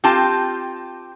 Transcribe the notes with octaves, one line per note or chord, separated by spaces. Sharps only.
C4 F4 G4 A5